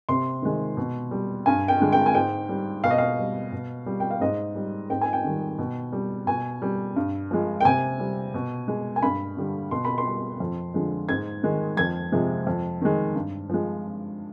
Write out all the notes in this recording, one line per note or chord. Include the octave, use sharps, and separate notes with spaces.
C3 C6
D#3 G#3
B2
G3
G2 G#5
G5
D3 G#3
G5
G#5
G#2 G5
G3
B2 F5
D#5
F5
G3
B2
G3
G5
F5
G#2 D#5
G3
G#2 G5
G#5
G5
D#3 G3
B2
G3
B2 G#5
G3
G2
F3 G#3
G5
C3 G#5
G3
B2
G#3
G#5
G2 B5
D3 G3
B2 C6
B5
C6
G3
F2
D3 F3 G#3
G#2 G#6
D#3 G#3
F2 G#6
C3 F3 G#3
F2
D#3 G#3
G2
F3 G#3